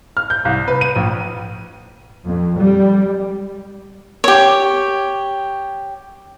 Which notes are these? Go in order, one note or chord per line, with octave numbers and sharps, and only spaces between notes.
F6
G6
C2
B4
D#7
A#1
F2
G3
G4 C#5